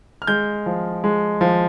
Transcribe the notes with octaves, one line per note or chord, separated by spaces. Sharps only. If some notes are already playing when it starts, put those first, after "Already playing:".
F6
G#3 G6
F3
G#3
F3